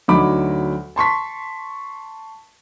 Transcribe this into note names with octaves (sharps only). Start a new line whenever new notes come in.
D2 F#3 D#4 B5 D6
A5 C6 C#6 B6